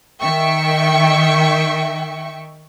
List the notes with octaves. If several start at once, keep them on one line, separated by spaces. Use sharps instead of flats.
D#3 E5 G5 C#6